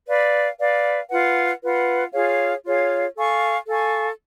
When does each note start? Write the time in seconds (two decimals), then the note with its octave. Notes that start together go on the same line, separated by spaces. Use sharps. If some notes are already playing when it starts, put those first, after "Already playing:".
0.07 B4 D5 F5
0.59 B4 D5 F5
1.10 F4 B4 F#5
1.62 F4 B4 F#5
2.13 F4 G#4 C#5 F5
2.64 F4 G#4 C#5 F5
3.16 A4 F5 G#5 C#6
3.67 A4 F5 G#5 C#6